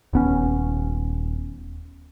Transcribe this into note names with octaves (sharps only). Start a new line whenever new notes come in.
D#1 B3 C#4